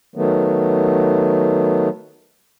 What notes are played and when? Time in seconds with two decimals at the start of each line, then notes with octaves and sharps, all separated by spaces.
0.16 D#3 F#3 A3 B3